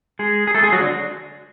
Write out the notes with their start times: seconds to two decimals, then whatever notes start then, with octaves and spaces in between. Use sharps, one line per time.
0.19 G#3 G#4
0.47 G#4
0.54 A3 A4
0.63 G#3 G#4
0.72 F#3 F#4
0.81 D3 D4